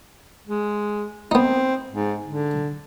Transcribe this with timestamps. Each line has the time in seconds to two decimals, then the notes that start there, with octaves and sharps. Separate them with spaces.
0.48 G#3
1.31 B3 C4 D#4
1.92 G#2
2.25 D3